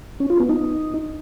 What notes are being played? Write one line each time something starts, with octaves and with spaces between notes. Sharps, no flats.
C#4
F4
B3
D#4